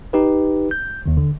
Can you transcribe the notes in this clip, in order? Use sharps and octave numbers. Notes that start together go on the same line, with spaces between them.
D#4 G4 B4
G6
D#2 D#3
D3